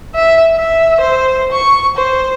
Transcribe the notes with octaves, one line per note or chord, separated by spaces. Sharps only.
E5
E5
C5
C#6
C5